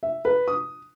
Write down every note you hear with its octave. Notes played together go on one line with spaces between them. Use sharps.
E5
B4
D#6